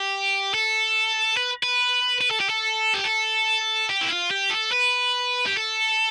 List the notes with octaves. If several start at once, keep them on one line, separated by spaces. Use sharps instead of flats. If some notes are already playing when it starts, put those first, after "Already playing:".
Already playing: G4
A4
B4
B4
B4
A4
G4
A4
G4
A4
G4
E4
F4
G4
A4
B4
G4
A4